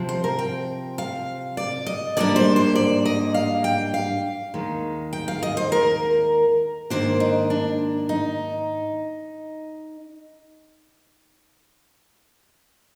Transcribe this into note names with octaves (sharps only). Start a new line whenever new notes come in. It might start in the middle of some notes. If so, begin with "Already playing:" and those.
Already playing: C3 F3 C4
C5
A#4
G5
F5
D5
D#5
G#2 G3 A#3 D4 D5
C5
C5
D5
D#5
F5
G5
F5
D#2 D#3 G#3
G5
F5
D#5
C5
A#4
G#2 D#3 A#3 D4 C5
D#4
D4
D#4